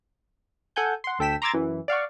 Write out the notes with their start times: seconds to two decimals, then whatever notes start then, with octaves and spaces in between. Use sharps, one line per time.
0.76 A4 F#5 G#5 G6
1.04 F#5 C6
1.19 D2 A4 G5 B6 E7
1.42 A#5 C6 D6 E6 G#6 A6
1.53 F#2 E3
1.88 D5 F5 F#5 C#6